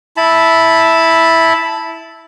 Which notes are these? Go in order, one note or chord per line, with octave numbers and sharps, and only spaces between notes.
E4 A5 B5